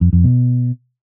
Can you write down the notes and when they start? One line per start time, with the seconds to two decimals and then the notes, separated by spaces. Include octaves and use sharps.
0.01 F2
0.13 F2
0.24 B2